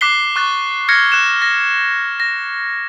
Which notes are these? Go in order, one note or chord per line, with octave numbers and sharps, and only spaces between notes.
D6 F#6 B6 C7 G7
C#6 F#6 A6
F6 G#6 A#6 C#7
F#6 E7
A#6
A#6